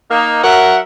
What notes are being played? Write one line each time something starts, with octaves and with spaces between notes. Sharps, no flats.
A#3 D#4
F#3 A#4 E5 F#5